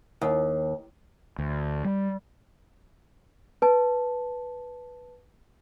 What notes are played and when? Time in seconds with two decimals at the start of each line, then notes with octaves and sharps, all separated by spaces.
0.21 D#2
1.38 D2
1.85 G3
3.62 B4 A5